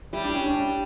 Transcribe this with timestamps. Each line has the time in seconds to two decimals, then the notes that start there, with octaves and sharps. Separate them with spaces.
0.13 G3 E4
0.24 D4
0.35 C#4
0.46 D4
0.56 D4